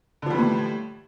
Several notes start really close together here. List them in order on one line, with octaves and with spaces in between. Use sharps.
D3 F3 G3 E3 A2